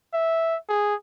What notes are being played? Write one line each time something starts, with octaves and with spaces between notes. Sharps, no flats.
E5
G#4